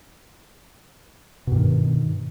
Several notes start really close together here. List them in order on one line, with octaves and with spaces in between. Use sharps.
B2 G2 D#3